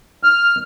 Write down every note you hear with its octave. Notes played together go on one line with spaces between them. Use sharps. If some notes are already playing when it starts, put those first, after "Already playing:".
F6